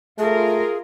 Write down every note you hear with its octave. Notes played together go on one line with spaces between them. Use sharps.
A3 F4 G#4 A#4